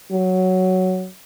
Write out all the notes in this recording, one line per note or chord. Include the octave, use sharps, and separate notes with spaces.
F#3